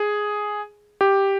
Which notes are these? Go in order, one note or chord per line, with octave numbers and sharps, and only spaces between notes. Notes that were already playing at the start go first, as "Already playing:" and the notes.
Already playing: G#4
G4